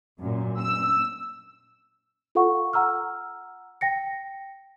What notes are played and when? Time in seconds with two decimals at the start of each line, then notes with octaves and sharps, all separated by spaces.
0.20 F#2 A#2
0.60 E6
2.35 F4 A4 F5 F#5 C#6
2.73 F#5 A#5 E6 F6
3.81 G5 A#6 C#7